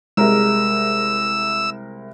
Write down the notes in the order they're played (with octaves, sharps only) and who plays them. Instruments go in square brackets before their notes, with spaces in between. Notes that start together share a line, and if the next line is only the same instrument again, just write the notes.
[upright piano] C2 A#4 E5 [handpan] G#3 [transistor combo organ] E6